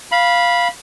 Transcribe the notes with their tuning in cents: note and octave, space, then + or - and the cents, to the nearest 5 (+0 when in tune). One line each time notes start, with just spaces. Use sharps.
F5 +0 B5 -15